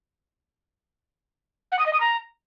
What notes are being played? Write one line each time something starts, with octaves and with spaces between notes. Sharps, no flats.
F#5
D#6
D#5
D#6
A#5